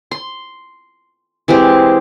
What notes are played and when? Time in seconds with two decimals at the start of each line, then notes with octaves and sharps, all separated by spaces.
0.11 C6
1.48 E3 G#3 C4 G4